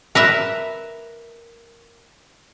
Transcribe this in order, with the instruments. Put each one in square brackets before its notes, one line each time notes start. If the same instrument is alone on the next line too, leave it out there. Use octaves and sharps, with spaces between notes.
[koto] A#4 B4 E5